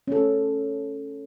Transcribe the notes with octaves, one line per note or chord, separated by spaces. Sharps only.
C#4 A4